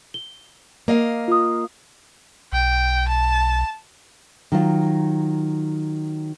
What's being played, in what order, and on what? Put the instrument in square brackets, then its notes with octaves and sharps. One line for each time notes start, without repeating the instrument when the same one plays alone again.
[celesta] G7
[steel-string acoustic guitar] A#3 D#5 F5
[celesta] F4 D#6
[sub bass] B1 [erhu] G5
[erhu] A5
[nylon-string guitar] D#3 F#3 F4